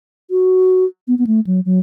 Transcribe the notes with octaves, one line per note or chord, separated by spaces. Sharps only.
F#4
B3
B3
A3
F#3
F#3